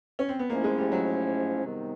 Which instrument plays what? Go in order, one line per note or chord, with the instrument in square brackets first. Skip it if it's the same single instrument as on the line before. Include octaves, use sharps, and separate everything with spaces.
[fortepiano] C#4
C4
B3
[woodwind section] G#2 F3 A3 C#4 E4 [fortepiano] A#3
[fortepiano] G#3
G3
F#3
[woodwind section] C3 D#3 G3 B3 D#4